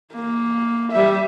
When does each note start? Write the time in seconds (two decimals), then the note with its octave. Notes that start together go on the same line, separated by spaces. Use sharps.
0.12 A#3
0.91 G3 E5